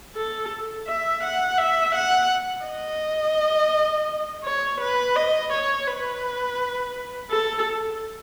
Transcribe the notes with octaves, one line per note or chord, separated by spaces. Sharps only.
A4
E5
F#5
E5
F#5
D#5
C#5
B4
D#5
C#5
B4
A4